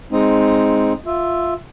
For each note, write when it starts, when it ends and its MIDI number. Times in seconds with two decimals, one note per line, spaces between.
0.12 0.93 56
0.12 0.93 60
0.12 0.93 63
1.06 1.54 65
1.06 1.54 76